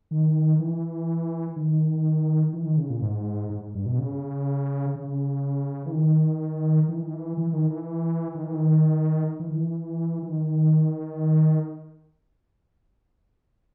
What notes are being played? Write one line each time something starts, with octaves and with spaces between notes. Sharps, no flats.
D#3
E3
D#3
E3
D#3
C#3
A#2
G#2
G#2
G2
B2
C#3
C#3
E3
D#3
E3
D#3
E3
E3
D#3
E3
D#3
E3
D#3
E3
D#3
E3
E3
D#3